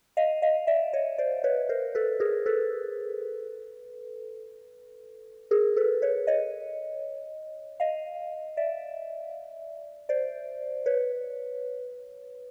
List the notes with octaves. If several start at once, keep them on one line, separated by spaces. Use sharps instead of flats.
D#5 F5
D#5 F5
D5 E5
C#5 D#5
C5 D5
B4 C#5
A#4 C5
A4 B4
G#4 A#4
A4 B4
G#4 A#4
A4 B4
B4 C#5
C#5 D#5
D#5 F5
D5 E5
C5 D5
B4 C#5